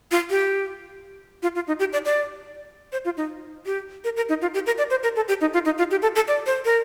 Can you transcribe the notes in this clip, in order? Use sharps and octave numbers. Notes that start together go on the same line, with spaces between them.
F4
G4
F4
F4
D#4
G4
D5
D5
C5
F4
D#4
G4
A#4
A#4
D#4
F4
G4
A#4
D5
C5
A#4
A4
G4
D#4
F4
D#4
F4
G4
A4
A4
D5
C5
A#4